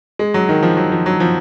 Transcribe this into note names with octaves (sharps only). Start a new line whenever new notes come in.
G#3
F#3
D#3
F3
F#3
F3
F#3
F3